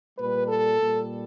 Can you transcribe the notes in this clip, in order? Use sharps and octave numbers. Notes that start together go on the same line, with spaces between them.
A#2 G3 B4
A4
A#2 G3